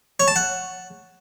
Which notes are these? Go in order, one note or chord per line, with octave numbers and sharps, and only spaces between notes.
C#5
A5
F#5